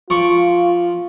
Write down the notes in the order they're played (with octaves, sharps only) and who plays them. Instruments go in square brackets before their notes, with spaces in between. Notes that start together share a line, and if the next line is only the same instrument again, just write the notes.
[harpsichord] F3 C#6 D6 [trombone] F4